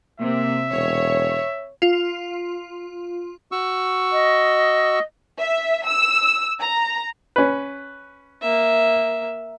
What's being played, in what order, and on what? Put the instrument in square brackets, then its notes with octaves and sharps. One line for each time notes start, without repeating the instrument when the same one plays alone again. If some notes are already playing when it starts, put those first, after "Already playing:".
[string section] C3 [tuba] A#3 [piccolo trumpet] E5
[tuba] E1 [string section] C#5
[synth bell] F4
[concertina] F#4 C#6 E6
[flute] D#5
[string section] E5
E6
A#5
[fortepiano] C#4 B4
[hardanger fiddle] A#3 E5